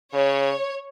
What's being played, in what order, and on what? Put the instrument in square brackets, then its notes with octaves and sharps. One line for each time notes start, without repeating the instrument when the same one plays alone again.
[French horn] C#3 [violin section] C#5